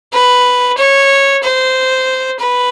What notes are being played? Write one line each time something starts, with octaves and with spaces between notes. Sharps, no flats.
B4
C#5
C5
B4